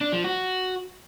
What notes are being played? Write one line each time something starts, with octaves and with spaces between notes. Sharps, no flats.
D4
F3
F#4